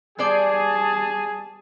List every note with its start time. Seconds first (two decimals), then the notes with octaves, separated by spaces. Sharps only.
0.18 G3 B3 G#4 C5 D5 A5